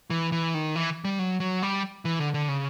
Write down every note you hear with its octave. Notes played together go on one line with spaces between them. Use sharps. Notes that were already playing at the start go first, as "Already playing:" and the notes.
E3
E3
D#3
E3
G3
F#3
F#3
G3
E3
D3
D3
C#3